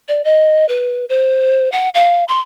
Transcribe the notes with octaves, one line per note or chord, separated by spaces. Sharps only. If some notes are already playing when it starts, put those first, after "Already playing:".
D5
D#5
B4
C5
F#5
F5
C6